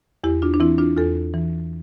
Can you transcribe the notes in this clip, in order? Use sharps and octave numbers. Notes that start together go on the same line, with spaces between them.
E2 E4 G4
D4 F4
D4
E3 C4 E4
D4 F4
E2 F4 A4
E3